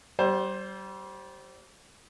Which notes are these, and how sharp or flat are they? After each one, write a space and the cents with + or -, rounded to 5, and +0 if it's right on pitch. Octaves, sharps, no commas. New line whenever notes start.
G3 -30 C5 +15